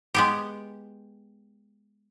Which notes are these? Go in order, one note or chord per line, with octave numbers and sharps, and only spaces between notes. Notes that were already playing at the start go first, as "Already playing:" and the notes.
G#3 B3 G4